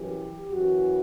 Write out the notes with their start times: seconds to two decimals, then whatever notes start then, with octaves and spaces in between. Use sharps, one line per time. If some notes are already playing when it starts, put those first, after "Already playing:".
Already playing: F#2 E3 G4
0.52 F#2 E3 F#4